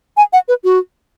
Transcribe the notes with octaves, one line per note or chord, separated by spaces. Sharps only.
G#5
F#5
B4
F#4